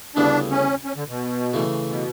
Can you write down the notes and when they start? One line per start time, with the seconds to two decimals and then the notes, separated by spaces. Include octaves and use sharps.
0.16 D2 C#3 G3 B3 D4 E4
0.51 C#4
0.84 C#4
0.96 D3
1.08 B2
1.54 C#3 E3 A3
1.88 B2